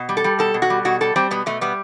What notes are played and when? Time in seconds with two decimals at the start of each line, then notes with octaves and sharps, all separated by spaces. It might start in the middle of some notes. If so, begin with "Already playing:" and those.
Already playing: B2
0.09 G3
0.17 A4
0.24 G3
0.39 B2 A4
0.54 B2
0.62 F#4
0.70 G3
0.85 B2 F#4
1.01 G3 A4
1.16 G3 C4
1.31 B2 B3
1.46 B2 A3
1.61 G3 B3